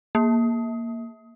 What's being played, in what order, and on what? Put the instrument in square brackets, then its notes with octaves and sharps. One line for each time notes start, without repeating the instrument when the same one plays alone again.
[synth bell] A#3